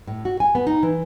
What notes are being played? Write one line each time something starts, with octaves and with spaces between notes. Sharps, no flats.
A2
F#4
G#5
B3
D#4
E3